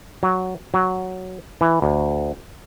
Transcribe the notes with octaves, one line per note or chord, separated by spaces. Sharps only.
F#3
F#3
E3
D2